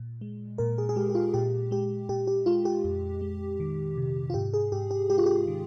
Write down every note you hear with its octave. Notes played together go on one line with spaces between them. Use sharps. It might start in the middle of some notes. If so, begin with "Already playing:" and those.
Already playing: A#2
G#3
A#2 A#4
G#4
G#4
G#3 G4
G4
F4
A#2 G4
G#3 G4
A#2 G4
G4
G#3 F4
G4
F2
G#3
D#3
C3
F4
G#2 G4
G#4
G#2 G4
G4
G#3 G4
F4
G4
D#3